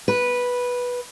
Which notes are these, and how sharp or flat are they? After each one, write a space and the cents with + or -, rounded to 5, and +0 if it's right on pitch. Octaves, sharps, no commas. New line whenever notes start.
B4 -10